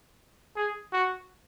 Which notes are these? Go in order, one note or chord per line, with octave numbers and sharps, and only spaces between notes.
G#4
F#4